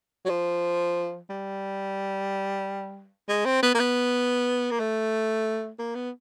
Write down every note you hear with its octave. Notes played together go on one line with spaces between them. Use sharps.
F#3
F3
G3
G#3
C4
B3
A#3
B3
A#3
A3
A#3
B3